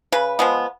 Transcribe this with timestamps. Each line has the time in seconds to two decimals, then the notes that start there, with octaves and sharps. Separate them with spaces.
0.12 C#3 B4
0.39 F3 G#3 B3